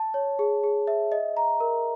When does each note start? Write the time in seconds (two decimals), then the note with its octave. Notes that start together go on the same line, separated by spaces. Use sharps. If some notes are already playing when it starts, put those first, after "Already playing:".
Already playing: A5
0.14 C#5
0.39 G#4
0.64 G#4
0.87 E5
1.12 D#5
1.37 A#5
1.60 A#4